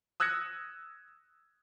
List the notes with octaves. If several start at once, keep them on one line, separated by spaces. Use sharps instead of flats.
D#6 E6 F#6 G#6 A#6 C#7